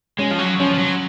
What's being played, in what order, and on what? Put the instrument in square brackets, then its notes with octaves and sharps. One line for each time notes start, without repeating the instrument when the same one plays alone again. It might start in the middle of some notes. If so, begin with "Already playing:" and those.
[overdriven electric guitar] G#3 [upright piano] C#4
[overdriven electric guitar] F3
F#3
[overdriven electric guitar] F3 [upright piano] C#4
[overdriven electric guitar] F3
F#3